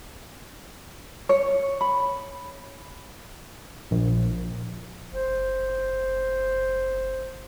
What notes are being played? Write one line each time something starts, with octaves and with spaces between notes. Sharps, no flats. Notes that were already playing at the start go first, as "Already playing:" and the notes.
C#5
B5
A#1
F#1 C5